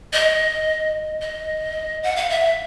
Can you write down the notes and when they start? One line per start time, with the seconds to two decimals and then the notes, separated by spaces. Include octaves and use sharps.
0.13 D#5
1.21 D#5
2.03 F#5
2.16 F5
2.30 E5